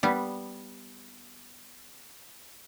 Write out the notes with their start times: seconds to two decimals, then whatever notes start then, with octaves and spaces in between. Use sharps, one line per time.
0.03 G3 B3